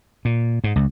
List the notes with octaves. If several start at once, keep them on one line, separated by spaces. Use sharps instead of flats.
A#2
G#2
C#2